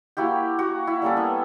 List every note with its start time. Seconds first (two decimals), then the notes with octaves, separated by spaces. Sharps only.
0.17 A#3 E4 F#4 G4
0.59 F#4
0.87 E4
1.02 G3 A#3 C#4 A4
1.17 B3